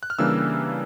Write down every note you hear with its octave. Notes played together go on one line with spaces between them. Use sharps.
F#6
F6
C#3 E3 G3 A#3 D4 E6